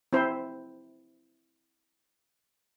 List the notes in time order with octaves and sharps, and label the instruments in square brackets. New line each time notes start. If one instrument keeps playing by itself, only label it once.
[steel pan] C4 E4 C5